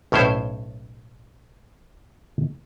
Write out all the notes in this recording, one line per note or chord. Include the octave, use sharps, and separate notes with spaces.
B1 A2 C#4 E4 C5